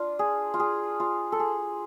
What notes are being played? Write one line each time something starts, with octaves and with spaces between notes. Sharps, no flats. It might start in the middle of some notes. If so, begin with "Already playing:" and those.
Already playing: D4 F4
G#4
F4
G#4
F4
A4
G#4